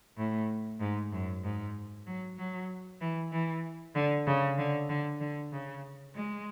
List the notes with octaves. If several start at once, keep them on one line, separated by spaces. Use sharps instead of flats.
A2
G#2
F#2
G#2
F#3
F#3
E3
E3
D3
C#3
D3
D3
D3
C#3
G#3